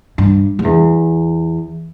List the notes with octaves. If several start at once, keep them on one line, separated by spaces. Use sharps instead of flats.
G2
G2
E2